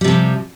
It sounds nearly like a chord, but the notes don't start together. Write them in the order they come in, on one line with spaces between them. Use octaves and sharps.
G3 C3 F3